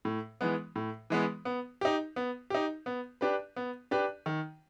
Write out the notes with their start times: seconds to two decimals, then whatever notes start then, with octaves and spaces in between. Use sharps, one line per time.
0.05 A2
0.41 E3 G#3 B3
0.76 A2
1.10 E3 G#3 B3
1.45 B3
1.81 D#4 G4
2.16 B3
2.50 D#4 G4
2.86 B3
3.21 D4 G4 B4
3.56 B3
3.91 D4 G4 B4
4.26 D#3